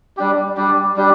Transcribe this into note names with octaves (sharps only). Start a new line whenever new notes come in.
G3 D4 G4
G3 D4 G4
G3 D4 G4